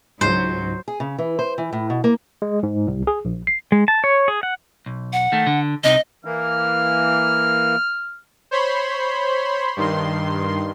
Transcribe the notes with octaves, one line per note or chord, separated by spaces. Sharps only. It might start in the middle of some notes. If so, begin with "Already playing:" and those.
C#2 G#2 F#3 C5
G#4
C#3
E3
C5
E3
A2
B2
A#3
G#3
G#2
C2
G#4
A#1
C7
G#3
A5
C#5
G#4
F#5
B1
F#5
D#3 A3
D3
C2 C3 D#4 D#5
E3 A#3 F6
C5 C#5 B5 C6
G2 D#3 C6